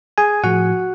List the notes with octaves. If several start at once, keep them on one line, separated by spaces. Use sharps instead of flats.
G#4 G#5
A2 F3 F#4 F#5